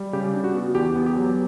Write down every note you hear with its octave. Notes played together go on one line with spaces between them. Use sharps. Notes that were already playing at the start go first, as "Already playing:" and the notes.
Already playing: G3
C#3 G4
D4
F#4
B3
E2 G4
B3
G4
F#3